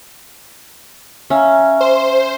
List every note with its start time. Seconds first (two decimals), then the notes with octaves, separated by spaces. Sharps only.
1.30 C#4 E5 F5 A#5
1.80 C5